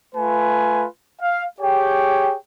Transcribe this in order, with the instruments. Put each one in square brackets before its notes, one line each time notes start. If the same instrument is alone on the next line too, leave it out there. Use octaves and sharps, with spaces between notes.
[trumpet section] A3 F4 B4 G#5
F5
G4 G#4 C#5 G5